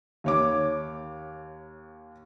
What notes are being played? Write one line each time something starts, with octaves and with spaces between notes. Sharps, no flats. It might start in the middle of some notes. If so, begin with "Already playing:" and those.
D#2 C#5 D6